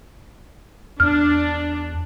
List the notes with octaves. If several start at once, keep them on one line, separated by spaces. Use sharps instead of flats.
E2 D4 F6